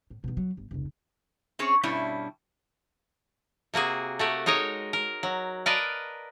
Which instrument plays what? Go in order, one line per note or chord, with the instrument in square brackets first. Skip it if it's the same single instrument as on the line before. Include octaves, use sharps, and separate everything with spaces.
[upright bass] A2
B2 D#3
F#3
G1
F1 C#2
[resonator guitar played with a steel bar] C4 C#4 G#4 C#5
G2 B2 G3 C#4 D4 E4
[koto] C3 A#3 F#4 G#4
A3 F#4 G4
G#3 D#4 A#4 C#5 D#5
A#4
F#3
A#4 B4 D5 D#5 F5 A5